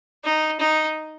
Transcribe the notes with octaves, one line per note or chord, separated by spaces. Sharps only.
D#4
D#4